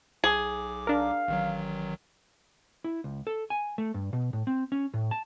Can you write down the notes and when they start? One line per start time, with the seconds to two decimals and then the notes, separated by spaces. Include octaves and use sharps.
0.24 B1 G#4 D6
0.87 D4 A#4 F5
1.28 A1 D#3 F#3
2.84 E4
3.04 C#2
3.27 A4
3.50 G#5
3.78 A3
3.94 G2
4.13 B2
4.33 A2
4.47 C4
4.72 C#4
4.94 A2
5.11 A5